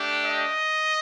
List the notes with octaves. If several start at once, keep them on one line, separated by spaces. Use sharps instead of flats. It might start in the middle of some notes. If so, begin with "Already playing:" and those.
Already playing: A3 D4 G4
D#5